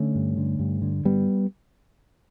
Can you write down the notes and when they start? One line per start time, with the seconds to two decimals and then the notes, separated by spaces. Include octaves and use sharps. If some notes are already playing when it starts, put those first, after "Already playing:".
Already playing: D3 A3 C#4
0.15 G2
0.38 D3
0.59 G2
0.82 D3
1.05 G2 G3 B3